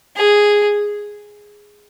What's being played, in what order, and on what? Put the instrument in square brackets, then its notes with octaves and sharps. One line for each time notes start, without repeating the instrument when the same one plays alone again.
[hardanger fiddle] G#4